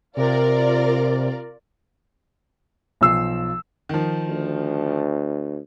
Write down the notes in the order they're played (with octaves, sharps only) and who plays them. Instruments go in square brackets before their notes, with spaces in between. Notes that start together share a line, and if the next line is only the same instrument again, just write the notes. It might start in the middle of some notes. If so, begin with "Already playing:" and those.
[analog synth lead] C3 [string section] F4 A#4 D5
[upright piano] B1 F3 E6 C7
D#3 F3
[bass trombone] D2